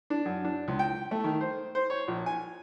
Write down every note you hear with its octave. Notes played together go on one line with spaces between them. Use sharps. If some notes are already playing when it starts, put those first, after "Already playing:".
D4
F#2
D4
C#2
G5
A3
D#3
C5
C5
C#5
A#1
G#5